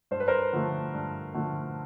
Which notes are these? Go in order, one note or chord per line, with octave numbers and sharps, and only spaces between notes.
G2 C5
B4
A#4 C5
D3 F3 A3
G2
D3 F3 A3